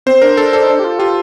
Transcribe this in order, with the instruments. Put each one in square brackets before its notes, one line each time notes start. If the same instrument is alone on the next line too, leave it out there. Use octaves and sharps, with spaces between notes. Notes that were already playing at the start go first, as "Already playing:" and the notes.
[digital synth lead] C4 [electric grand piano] C5
[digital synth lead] D4 [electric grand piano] A#4
[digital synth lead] D4 [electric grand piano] A4
[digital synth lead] D4 [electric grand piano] A4
[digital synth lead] D#4
D4
G4
F4
[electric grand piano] F4 [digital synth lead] G4